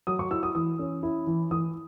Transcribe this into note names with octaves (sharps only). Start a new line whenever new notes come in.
F#3 D#6
C#6
E4 E6
D#6
E3 D#6
C#4
E4
E3
E3 D#6